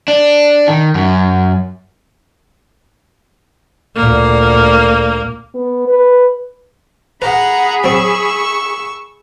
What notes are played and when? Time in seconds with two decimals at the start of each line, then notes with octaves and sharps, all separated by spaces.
0.08 D4
0.68 D#3
0.95 F#2
3.96 D2 A#2 A#3
5.55 B3
5.87 B4
7.22 G#4 B4 F#5 A#5 B5
7.84 F#3 C4 C#6 E6